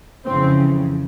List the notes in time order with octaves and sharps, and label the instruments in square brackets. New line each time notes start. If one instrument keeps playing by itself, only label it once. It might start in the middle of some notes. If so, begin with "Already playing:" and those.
[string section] F2 C#3 E3 C4